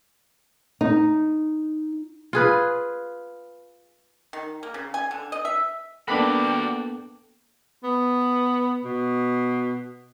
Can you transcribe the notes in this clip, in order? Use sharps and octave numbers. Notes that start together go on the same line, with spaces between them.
D#4
F4 G#4 B4
D#3
A#3
C#3
G#5
D3
D#5
E5
A#3 B3 D4 F#4 A4 D5 G5 B5
B3
B2